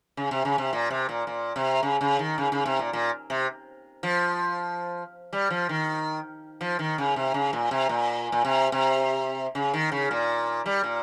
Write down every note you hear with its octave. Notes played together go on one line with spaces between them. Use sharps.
C#3
C3
C#3
C3
A#2
C3
A#2
A#2
C3
C#3
C#3
D#3
C#3
C#3
C3
A#2
A#2
C3
F3
G3
F3
D#3
F3
D#3
C#3
C3
C#3
A#2
C3
A#2
A#2
C3
C3
C#3
D#3
C#3
A#2
G3
A#2